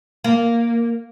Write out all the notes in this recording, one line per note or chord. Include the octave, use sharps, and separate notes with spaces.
A#3